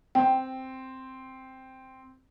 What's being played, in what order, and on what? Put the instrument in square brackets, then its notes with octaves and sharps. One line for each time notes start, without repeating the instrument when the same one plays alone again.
[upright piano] C4 [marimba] G5